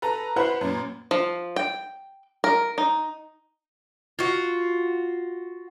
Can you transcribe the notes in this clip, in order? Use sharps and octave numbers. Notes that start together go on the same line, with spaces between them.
A4 B4 A#5
E4 B4 C5 F#5 B5 C6
F#2 A#2
F3
G5
A#4
D#4
F4 F#4